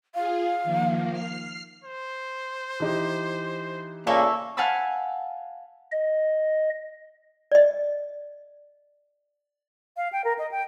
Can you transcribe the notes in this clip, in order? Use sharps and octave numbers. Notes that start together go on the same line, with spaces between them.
F4 G#4 F5
D#3 F3 A#3
F6 C7
C5
E3 D#4 G4
A#2 C#3 A#3 A4 C#5 E5
F5 F#5 G#5 A5 B5 E6
D#5
D5 D#5
F5
G5
A#4
D#5
G5